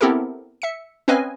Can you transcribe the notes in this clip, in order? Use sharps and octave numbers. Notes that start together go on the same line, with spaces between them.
B3 C4 E4 G4 A4 A#4
E5 C#7
C4 C#4 B4 D#5 F5 G#5